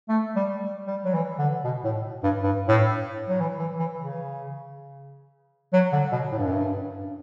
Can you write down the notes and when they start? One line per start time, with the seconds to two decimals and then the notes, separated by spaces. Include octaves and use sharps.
0.09 A3
0.35 G3
0.87 G3
1.05 F#3
1.14 E3
1.38 D3
1.64 B2
1.84 A2
2.23 G2
2.43 G2
2.68 A2
3.28 F#3
3.40 E3
3.59 E3
3.79 E3
3.98 C#3
5.73 F#3
5.92 D3
6.12 B2
6.32 A2
6.38 G2
6.45 F#2
6.53 G2